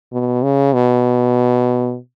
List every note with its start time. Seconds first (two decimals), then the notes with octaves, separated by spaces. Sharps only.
0.12 B2
0.43 C#3
0.73 B2